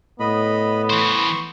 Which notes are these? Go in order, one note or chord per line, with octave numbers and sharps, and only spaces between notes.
A2 B3 D#5 B5
E3 C5 C6 C#6